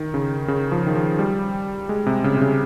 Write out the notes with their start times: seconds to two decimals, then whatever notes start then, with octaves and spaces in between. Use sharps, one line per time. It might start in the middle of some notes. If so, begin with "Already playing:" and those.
Already playing: D#3
0.14 C#3
0.48 C#3
0.72 F3
0.87 D#3
0.95 F3
1.19 G3
1.89 G#3
2.07 C3
2.24 C#3
2.37 C3
2.41 C#3